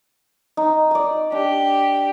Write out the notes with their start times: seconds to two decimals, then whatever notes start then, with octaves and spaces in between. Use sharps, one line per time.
0.57 D#4
0.91 D5 D#6
1.32 D4 G4